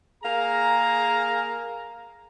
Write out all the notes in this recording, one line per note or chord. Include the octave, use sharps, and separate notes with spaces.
A#3 G#4 F5 A#5